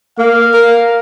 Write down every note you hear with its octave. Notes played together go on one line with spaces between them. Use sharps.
A#3 F5
A#4